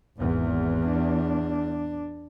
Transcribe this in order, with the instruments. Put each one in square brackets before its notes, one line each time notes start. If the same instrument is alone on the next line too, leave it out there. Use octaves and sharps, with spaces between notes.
[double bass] G#1 [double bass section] E2
[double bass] D4